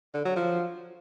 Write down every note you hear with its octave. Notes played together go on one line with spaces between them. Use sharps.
D3
F#3
F3